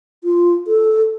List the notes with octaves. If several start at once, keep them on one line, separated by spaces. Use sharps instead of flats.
F4
A4